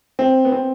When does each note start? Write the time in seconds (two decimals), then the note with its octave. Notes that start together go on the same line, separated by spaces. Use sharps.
0.19 C4
0.45 B3
0.52 C4